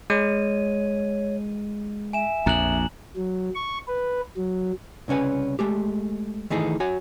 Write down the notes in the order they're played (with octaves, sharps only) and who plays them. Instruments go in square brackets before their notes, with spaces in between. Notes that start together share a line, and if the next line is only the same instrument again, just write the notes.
[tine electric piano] G#3 [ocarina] C#5 [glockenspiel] D#7
[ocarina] E5 [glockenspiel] G#5 E7
[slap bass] A#1 F2 [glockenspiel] A#5 F#6 F#7
[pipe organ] F#3
C#6
B4
F#3
[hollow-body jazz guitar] C2 C#3 C#4 B4 G#5
G#3 A3 G4
D#3 E3 A3 D#4 G#4
F#4 C#5 G#5